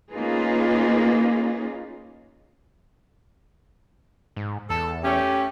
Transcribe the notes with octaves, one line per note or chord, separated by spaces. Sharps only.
A#3 C#4 D#4 F4 G#4 B4
G#2
E2 A4
A3 C#4 G4